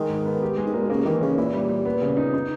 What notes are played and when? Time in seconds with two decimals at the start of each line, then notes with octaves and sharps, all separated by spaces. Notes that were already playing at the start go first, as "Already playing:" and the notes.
Already playing: D#3 G#3
0.10 G#2
0.25 B3
0.42 G4
0.57 G#3
0.66 G#2
0.73 A#2 A#4
0.82 B2
0.90 C#3 A#3
1.05 D#3 E3
1.21 C#3 C#4
1.37 A#2 E4
1.53 G3
1.69 G3
1.85 B3
2.02 C#3
2.17 D#4
2.34 D#4